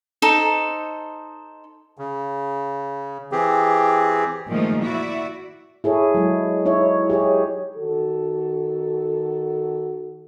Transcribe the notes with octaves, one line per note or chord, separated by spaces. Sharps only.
D#4 A4 C5
C#3
E3 C4 G4 G#4
A#2 D#3 F3 G#3 A3 D#4
E4 F#4 D5 E5
E4 G#4 A4 C#5
F#3 G#3
D#4 E4 C#5 E5
G4 G#4 C#5
D#3 F#4 A4